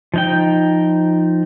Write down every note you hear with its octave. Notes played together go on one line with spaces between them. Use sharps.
F3 D#4 G5